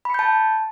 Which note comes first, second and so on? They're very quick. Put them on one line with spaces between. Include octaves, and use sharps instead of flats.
B5 C#7 G6 A5